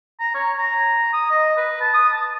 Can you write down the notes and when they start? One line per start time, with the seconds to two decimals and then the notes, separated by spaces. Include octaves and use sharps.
0.20 A#5
0.35 C#5
0.58 A#5
1.13 D#6
1.30 D#5
1.57 B4
1.81 A5
1.94 D#6
2.12 A5